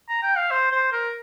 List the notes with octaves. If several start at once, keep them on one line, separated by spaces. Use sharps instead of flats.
A#5
G5
F5
C5
C5
A#4